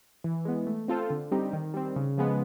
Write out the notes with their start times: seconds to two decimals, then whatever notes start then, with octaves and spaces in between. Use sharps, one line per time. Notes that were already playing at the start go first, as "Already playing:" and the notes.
0.24 E3
0.45 G#3 B3
0.67 A3
0.88 C4 F4 A4 C5
1.10 D3
1.31 G3 C4 D#4 G4
1.53 D#3
1.74 G3 C4
1.96 C#3
2.18 F3 G#3 B3